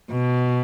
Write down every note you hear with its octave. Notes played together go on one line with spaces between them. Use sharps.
B2